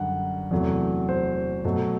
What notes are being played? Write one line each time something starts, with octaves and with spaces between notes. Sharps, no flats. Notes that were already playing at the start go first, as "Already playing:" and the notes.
Already playing: F#2 D3 G3 F#5
E2 C3 F#3 A3
C5
B2 F#3 A3